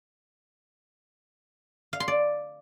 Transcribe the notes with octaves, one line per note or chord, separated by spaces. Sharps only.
F5
C6
D5